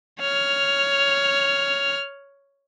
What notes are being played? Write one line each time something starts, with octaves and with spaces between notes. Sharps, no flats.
C#5 F6